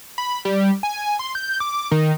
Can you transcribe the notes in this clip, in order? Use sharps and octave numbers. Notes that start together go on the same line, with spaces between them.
B5
G3
G#5
C6
G6
D6
D#3